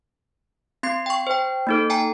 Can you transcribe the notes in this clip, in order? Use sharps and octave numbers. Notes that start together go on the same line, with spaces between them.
C4 C6 G#6 C7
G5 C#6
C5 G5
A#3 D#4 A4
G5 G#5 A#5